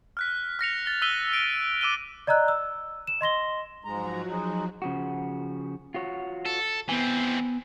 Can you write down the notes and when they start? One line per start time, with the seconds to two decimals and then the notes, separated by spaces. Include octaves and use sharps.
0.17 F6 F#6 B6
0.59 F6 A#6 C#7 F7
0.86 A6 G7
1.02 E6 F#6 B6 D#7 G7
1.33 D7
1.81 D6 E6 D#7 G7
2.27 D5 D#5 A#5 E6 F#6
2.48 E6
3.07 E7
3.21 D#5 C6 A#6 G7
3.85 G#2 F3 F#3 G#3 F#4 A#5
4.28 G#3 D#4
4.82 C#3 F3 F#4
5.94 F4 F#4 C#5
6.46 A4
6.89 E3 B3 C4 G#5